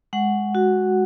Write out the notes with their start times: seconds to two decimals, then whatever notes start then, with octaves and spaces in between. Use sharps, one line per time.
0.13 G#3 F#5
0.55 F#4